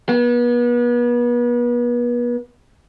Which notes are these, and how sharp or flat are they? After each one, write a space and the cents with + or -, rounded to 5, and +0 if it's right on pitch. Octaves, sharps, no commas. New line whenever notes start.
B3 -35